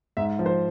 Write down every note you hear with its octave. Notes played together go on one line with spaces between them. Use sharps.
G#2 E5
F3
C5